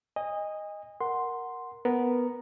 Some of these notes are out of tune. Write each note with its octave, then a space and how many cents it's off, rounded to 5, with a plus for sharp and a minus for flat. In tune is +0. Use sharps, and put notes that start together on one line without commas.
D#5 +0 G#5 -35
A#4 +0 F#5 +0 C6 +0
B3 +0 A#4 +0